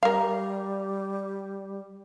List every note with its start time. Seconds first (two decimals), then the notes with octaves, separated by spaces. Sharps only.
0.03 G3 A#4 F5